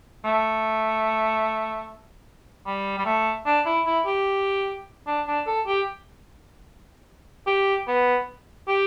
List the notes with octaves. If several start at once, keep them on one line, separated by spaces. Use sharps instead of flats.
A3
G3
G3
A3
D4
E4
E4
G4
D4
D4
A4
G4
G4
B3
G4